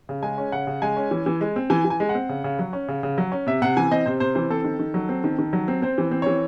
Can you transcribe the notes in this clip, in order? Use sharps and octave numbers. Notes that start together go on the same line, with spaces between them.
C#3
G#3 G#5
C#4
C#3 F#5
C#3
G#3 G#5
C#4
E3
E3
G#3
C4
E3 G#5
E3
G#5
G#3
F#5
C4
C#3
C#3
F#3
C#4
C#3
C#3
F#3
C#4
C3 E5
C3 F#5
E3 G#5
C4 D#5
C3 C5
C3 C5
E3 C5
C4 A4
D#3
D#3
F#3
C4
D#3
D#3
F#3
C4
C4 C5
E3
C4
E3 C#5